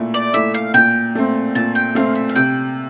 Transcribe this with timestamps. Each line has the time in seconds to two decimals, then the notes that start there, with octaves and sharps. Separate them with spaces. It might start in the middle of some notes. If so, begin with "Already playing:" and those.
Already playing: A#2 A3 E4
0.14 D5
0.34 A3 E4 E5
0.54 F5
0.74 A#2 G5
1.15 A3 C4
1.55 A#2 A5
1.75 G5
1.95 A3 C4 F5
2.15 E5
2.29 F5
2.35 C3 G5